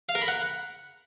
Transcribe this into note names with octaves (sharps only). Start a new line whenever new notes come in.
F5
A#4
B5
F#5